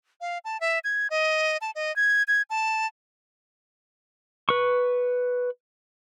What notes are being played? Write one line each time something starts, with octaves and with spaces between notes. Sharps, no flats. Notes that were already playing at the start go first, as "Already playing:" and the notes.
F5
A5
E5
G#6
D#5
A5
D#5
G#6
G#6
A5
B4 C#6